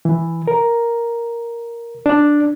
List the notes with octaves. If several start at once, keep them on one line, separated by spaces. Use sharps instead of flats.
E3
A#4
D4